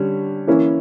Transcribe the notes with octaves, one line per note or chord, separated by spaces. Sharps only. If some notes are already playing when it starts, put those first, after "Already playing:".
Already playing: D3 G3 C#4
E3 A#3 C#4 E4